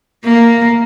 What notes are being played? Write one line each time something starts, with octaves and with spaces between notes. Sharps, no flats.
A#3